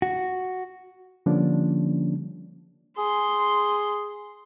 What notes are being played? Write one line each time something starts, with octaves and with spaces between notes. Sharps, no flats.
F#4
D3 F3 G3 A#3 C#4 D4
G#4 C6